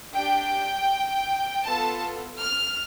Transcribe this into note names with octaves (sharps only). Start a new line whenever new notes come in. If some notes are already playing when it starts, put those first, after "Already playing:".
D4 G4 G5
B3 F4 A4 A5
F6